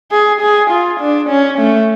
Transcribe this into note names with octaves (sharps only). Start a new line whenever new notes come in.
G#4
G#4
F4
D4
C#4
A3